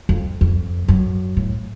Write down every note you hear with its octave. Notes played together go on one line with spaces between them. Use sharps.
F2
F2
F#2
A2